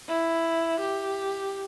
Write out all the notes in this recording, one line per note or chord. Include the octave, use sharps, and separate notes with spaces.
E4
G4